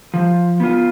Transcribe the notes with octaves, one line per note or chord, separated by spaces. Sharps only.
F3
B3 F4